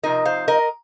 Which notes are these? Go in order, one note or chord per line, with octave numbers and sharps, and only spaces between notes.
C3 F3 C4 D#4 A#4 D#5
C5 F5
A#4 D#5